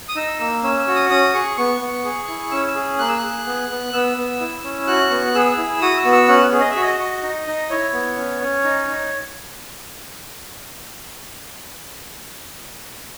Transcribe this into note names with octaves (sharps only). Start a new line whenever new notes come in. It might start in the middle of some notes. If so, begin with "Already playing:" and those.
D#6
D#4 E6
A#3 E6
C#4 E6
E6
F#4
D#6
C#4 D#6
G#4 C#6
B3 C#6
B3
G#4
E4
C#4 E6
E6
G#4
A#3 F#6
E6
F#6
G#4
B3
B3
B3 E6
B3
E4
C#4
F#4 F#6
B3
G#4 E6
E4
F#4 D#6
E6
B3
E6
C#4 F#5
G#4
D#5
E5
F#4 D#5
F#4
D#4
D#4
E4 C#5
B3
C#4
C#4
D#4
D#4